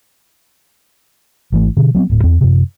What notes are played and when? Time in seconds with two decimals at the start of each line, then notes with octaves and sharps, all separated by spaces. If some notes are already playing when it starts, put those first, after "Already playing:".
1.52 G#1 E3 A3
1.77 B2 D3
1.95 F#3 B3 C4
2.09 D1 A2
2.24 E2 C4
2.41 F#2 C3